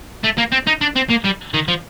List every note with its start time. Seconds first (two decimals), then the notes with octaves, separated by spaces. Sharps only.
0.24 A3
0.38 A#3
0.52 C4
0.67 D#4
0.81 D4
0.96 C4
1.10 A#3
1.25 G3
1.54 D#3
1.68 F3